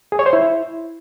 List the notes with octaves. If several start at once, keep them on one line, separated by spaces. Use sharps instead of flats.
G#4
C#5
C5
E4